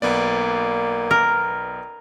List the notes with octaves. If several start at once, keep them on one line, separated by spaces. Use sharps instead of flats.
B1 A#3 B3 D5
A#4